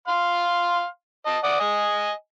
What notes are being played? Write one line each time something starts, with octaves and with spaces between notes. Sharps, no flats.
F5 C6
D#5 A5
D5 F#5 D#6
D#5 G#5